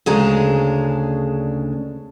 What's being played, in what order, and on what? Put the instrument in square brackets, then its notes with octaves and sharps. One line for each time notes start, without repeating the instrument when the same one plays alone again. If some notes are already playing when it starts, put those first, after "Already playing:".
[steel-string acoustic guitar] D2 C#3 G#3 C#4 D4 A#5